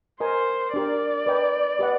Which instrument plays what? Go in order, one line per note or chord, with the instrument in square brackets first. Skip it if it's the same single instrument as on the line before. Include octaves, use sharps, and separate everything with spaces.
[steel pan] A#4 D#5 G#5 [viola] C5
[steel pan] D4 G4 A#4 [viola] D5
[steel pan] B4 D#5 G5 A#5
G4 B4 D#5 F#5